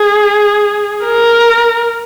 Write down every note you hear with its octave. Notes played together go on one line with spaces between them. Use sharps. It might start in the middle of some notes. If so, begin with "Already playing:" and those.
Already playing: G#4
A#4